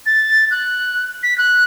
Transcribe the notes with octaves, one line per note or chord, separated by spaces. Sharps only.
A6
F#6
B6
F#6